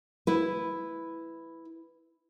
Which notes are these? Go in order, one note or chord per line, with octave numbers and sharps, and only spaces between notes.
E4 B4